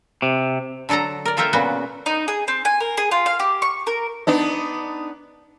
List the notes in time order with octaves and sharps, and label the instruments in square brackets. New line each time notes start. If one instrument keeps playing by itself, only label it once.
[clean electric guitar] C3
[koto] D3 F#3 A4 A5 A#5
A#4 D5
A#3 F4 A4 A#4 E5 G5
A#2 C#3 B3 F#4
[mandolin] D#4
G#4
C4
G#5
A#4
G#4
F4
F5
G4
C#6
A#4
[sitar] B3 D4 D#4